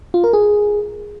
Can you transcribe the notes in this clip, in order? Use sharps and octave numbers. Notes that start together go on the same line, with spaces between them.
F4
A#4
G#4